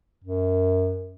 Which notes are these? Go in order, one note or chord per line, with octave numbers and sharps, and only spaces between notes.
F#2